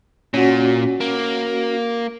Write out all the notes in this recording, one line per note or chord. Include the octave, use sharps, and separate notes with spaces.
A#2 C#4 F#4
A#3